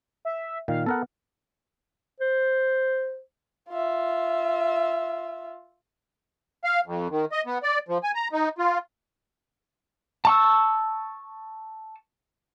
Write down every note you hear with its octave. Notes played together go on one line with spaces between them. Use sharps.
E5
A#2 D#3 F5
B3 A4 A#4 F#5
C5
F4 E5
F5
F2
D#3
D#5
B3
D5
F3
G#5
A#5
D#4
F4
A5 C#6 E6